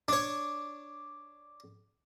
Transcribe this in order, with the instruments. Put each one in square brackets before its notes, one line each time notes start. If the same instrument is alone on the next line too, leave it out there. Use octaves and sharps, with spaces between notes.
[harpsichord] D4 C#5